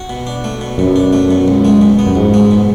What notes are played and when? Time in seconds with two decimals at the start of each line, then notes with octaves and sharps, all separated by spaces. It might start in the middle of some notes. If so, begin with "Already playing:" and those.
Already playing: F#4
0.10 B2
0.27 D4
0.44 A3
0.61 B2
0.78 F#2 B2
0.96 D4
1.13 A3
1.31 B2
1.48 C#2
1.65 G#3
1.82 B2
1.99 B3
2.06 F#2
2.15 C#2 G#2
2.34 G#3
2.51 B2